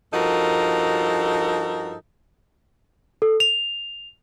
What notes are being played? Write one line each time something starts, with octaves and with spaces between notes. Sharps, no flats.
G2 F3 D#4 F#4 A4 A#4
A4
F7